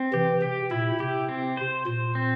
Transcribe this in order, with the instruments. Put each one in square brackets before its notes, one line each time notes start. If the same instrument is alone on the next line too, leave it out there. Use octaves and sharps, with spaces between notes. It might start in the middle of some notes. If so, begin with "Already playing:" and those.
Already playing: [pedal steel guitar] C4
[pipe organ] C3 E3 [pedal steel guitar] G4
[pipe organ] C3 [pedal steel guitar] G4
[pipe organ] A#2 [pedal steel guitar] E4
[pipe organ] C3 [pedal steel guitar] G4
[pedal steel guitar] C4
C5
[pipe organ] A#2 [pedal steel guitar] C5
[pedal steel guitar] C4